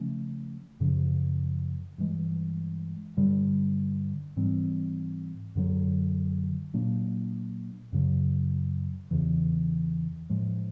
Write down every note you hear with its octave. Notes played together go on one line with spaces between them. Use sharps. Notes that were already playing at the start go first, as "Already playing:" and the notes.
Already playing: C#3 F3 A3 C#4
F#2 C#3 F3
G2 E3 G#3
G2 D3 G3
G#2 E3 G3 C4
F#2 D3 F#3
A#2 F#3 A#3 D4
F#2 C#3 F#3
E2 C#3 E3
A2 F3 G#3